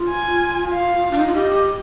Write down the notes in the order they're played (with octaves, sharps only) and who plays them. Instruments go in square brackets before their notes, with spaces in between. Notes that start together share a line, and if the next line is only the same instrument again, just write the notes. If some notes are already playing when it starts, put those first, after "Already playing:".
Already playing: [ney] F4
[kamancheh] G#5
F5
[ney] D4
D#4
F4
[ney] G4 [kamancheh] D#5